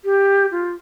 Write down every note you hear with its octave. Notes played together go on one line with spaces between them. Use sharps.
G4
F4